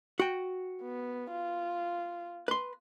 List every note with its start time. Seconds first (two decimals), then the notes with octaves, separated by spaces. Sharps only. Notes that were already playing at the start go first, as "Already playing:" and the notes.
0.20 F#4 G5
0.81 B3
1.31 F4
2.48 B4 C6